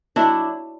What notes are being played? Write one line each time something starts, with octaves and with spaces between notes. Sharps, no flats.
F#3 D4 E4